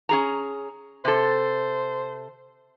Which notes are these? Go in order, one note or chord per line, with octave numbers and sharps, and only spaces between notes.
C#4 G#4 A#5
C3 A4 C5